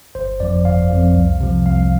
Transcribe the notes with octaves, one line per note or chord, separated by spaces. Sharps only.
G1 C5
F2 F3 D5
G1 F5
F2 F3
C2
C3 F3
C2 F5